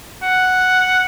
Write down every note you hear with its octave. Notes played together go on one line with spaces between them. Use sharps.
F#5